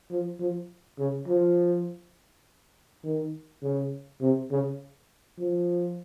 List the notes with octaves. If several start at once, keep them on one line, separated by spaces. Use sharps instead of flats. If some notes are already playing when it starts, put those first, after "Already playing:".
F3
F3
C#3
F3
D#3
C#3
C3
C#3
F3